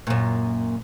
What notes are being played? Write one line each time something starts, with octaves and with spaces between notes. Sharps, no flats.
F#2 A#2